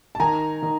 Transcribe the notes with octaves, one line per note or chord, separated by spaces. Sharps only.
A5
D#3 G#5 A#5
D#3